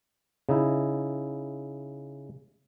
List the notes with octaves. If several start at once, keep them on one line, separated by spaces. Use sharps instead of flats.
C#3 D#4 E4